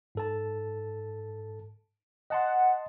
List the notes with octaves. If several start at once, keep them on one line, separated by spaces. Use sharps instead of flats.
G#2 A4 A5
D#5 F#5 A5 C6